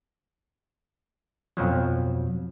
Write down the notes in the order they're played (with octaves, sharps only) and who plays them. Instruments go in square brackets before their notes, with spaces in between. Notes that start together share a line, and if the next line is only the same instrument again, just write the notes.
[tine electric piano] F2 B2 F3 F#3